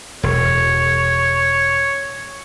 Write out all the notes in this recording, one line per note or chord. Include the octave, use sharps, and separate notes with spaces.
E1 C#5